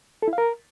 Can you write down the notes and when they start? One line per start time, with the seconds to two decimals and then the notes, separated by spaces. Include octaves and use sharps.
0.22 A4
0.28 E4
0.33 F5
0.38 A#4